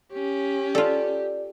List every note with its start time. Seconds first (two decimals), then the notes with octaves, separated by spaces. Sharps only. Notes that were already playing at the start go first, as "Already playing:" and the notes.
0.12 C#4 G4
0.75 F4 A4 D5